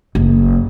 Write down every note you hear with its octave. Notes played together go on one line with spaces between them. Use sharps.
F#1